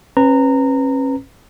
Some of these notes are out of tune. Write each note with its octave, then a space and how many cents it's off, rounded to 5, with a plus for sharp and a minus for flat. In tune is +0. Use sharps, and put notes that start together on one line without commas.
C#4 -35 B4 +0 A#5 -20